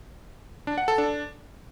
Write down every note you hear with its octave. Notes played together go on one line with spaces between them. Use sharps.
D4
F#5
A4
D4